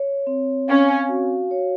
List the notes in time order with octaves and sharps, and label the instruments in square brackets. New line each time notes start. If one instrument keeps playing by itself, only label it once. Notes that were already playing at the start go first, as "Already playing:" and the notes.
Already playing: [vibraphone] C#5
C4
[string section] C#4 [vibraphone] F5
[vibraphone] F#4
C#5